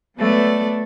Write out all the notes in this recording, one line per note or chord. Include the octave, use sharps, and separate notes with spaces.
F#3 A3 B3 A4 D5